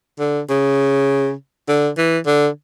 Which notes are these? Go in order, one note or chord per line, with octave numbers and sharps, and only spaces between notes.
D3
C#3
D3
E3
D3